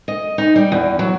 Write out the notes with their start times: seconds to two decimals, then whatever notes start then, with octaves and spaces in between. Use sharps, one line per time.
0.08 D#5
0.38 D#4
0.56 G3
0.72 E2
0.99 F#3